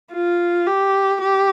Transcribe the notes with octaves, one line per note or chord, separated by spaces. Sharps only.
F4
G4
G4